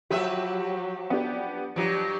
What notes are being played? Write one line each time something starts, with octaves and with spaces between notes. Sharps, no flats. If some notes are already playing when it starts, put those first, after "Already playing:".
F3 F#3 G4 B4 E5
B3 D4 G4
G2 F3 F#3 G4 D7